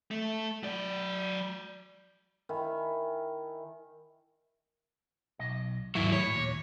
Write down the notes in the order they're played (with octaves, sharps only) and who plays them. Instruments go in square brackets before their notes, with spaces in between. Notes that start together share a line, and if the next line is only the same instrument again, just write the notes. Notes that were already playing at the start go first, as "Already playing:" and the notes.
[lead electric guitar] A3
F#3 D5
[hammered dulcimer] D#3 E4 G#5
[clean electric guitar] B1 D#5
[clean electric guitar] D#2 G#2 E5 [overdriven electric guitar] F#3 E4
[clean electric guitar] A2 E4 [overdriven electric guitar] C#5
[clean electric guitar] D#2 A#2